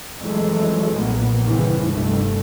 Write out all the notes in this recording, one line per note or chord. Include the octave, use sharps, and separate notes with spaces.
F2 E3 F#3 G#3 A3
B1 F2 A#2 A#3 B3
G1 C#3 E3 F3 G3 C4
F1 C2 G2 G3 A3